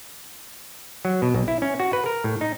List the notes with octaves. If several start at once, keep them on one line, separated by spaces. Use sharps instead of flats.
F#3
B2
B1
E4
C#4
F#4
B4
A#4
A2
D#4